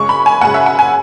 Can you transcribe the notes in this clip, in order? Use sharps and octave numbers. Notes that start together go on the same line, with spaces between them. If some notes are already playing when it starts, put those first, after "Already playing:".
Already playing: F#2 C#3 G#3 C#6
B5
G#5
F#2 C#3 G#3 F#5
E5
F#5
G#5